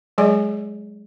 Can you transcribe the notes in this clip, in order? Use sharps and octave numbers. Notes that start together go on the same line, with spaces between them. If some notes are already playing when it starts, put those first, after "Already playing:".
F#3 G#3 G#4 D5 G#5